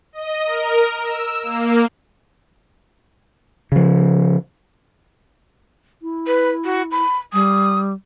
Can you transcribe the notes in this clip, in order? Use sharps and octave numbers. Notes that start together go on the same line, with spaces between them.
D#5
A#4
E6
A#3
C#3 F3
E4
B4
F#4
B5
G3 D#6